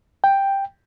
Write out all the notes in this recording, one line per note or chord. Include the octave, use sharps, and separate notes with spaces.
G5